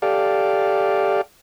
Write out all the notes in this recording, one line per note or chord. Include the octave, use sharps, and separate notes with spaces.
G4 A4 D5 F5